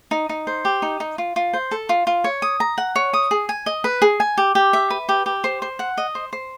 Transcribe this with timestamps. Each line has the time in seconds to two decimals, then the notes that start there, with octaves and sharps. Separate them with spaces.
0.11 D#4
0.29 D#4
0.47 C5
0.65 G4
0.82 D#4
1.00 D#4
1.18 F4
1.36 F4
1.53 C5
1.71 A4
1.89 F4
2.07 F4
2.24 C#5
2.42 D#6
2.60 A#5
2.78 F#5
2.96 C#5
3.13 D#6
3.31 G#4
3.49 G#5
3.66 D#5
3.84 B4
4.02 G#4
4.20 G#5
4.38 G4
4.55 G4
4.73 E5
4.90 B4
5.09 G4
5.26 G4
5.44 C5
5.62 C5
5.79 F#5
5.98 D#5
6.15 C5
6.33 C5